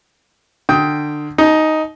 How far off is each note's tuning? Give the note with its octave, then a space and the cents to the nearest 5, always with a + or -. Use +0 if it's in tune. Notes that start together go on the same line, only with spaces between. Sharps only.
D3 +25 G5 +0 D#6 +25
D#4 +5 A5 -40